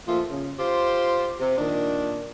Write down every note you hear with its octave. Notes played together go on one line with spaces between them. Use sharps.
A#2 F3 A3 F4
C#3
F4 G4 C5
C3
A#2 D#3 D4